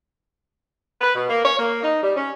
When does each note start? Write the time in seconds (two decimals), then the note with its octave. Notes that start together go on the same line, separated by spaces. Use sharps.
1.01 B4
1.15 B2
1.29 A#3
1.42 C#5
1.59 A#3
1.83 D#4
2.02 G3
2.16 C#4